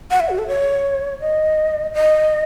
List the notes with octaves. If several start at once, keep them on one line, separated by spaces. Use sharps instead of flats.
F#5
E5
F#4
A4
C#5
D#5
D#5